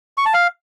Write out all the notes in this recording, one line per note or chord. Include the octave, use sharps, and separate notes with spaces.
C#6
A5
F5